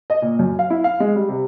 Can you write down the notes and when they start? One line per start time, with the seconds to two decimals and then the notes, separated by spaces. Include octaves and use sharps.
0.10 D#5
0.22 A#2
0.39 F#2
0.59 F5
0.70 E4
0.84 F5
1.00 G#3
1.16 G3
1.29 C3